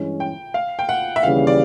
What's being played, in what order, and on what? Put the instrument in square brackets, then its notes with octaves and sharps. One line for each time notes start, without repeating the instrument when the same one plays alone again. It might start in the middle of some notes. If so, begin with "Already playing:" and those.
Already playing: [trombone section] G2 E3 G#3 C#4
[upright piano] G5
F5
G5
F#5
E5
[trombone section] D#2 C#3 E3 G3 [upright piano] F5
[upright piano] D5